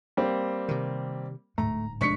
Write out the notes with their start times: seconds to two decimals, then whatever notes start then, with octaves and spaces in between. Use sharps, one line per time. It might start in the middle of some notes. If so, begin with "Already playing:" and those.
0.17 G3 A#3 C4
0.68 C3 D#3
1.58 D1 G#2 A3 A#5
2.01 F1 G#3 D4 C#6 B6 C#7